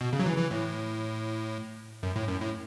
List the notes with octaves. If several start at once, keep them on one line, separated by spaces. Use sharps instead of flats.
B2
C#3
F#3
E3
E3
A2
F#2
A2
F#2
A2